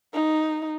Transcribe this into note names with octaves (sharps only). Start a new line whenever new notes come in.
D#4